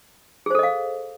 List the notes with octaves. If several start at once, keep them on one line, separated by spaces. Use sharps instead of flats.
G#4 A4 C5 D#5 F5